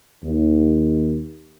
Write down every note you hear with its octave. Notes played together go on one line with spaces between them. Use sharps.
D#2